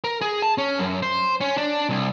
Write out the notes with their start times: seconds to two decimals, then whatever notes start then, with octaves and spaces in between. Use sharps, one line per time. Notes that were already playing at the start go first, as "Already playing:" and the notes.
0.04 A#4
0.21 G#4
0.42 A5
0.58 C#4
0.79 F#2
1.02 C5
1.41 C#4
1.58 D4
1.89 C2